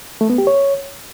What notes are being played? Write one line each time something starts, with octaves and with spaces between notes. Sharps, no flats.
A3
B3
G4
C#5